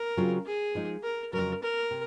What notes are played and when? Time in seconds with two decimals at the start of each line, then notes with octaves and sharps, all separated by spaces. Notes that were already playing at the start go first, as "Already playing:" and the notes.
Already playing: A#4
0.17 C#3 F#3 C4 F4 G#4
0.46 G#4
0.75 F3 G#3 D#4
1.03 A#4
1.33 F2 C#3 F#3 A#4
1.62 A#4
1.91 C3